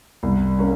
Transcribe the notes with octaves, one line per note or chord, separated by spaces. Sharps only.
C2
A#3 C#4